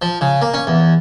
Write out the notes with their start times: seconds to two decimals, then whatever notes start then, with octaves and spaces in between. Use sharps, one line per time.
0.02 F3
0.21 C#3
0.42 A#3
0.54 C#4
0.67 E2